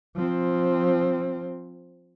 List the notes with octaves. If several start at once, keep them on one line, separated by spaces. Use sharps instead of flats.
F3 C4